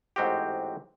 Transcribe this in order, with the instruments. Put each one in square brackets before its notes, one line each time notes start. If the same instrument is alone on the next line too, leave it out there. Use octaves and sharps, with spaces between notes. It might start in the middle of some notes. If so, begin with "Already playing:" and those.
[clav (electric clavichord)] A1 G#2 C4 F#4 G4